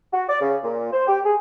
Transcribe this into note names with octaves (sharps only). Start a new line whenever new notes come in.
F#4
D5
C#3
A#2
C5
G4
G#4